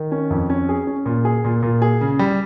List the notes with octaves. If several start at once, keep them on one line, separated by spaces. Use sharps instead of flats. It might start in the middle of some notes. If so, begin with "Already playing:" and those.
Already playing: D#3
C#4
F2
C#4
G#4
C#4
A#2
G#4
A#2
A#2
G#4
C#3
G3